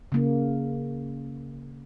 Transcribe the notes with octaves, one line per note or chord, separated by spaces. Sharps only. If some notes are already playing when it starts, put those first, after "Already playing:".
C#3 A#3